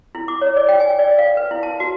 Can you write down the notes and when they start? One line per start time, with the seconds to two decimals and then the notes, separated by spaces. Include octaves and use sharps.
0.15 E4
0.28 D6
0.41 C#5
0.56 D5
0.69 G5
0.80 G#5
0.99 D5
1.19 F5
1.37 B4
1.51 E4
1.63 A5
1.80 F#4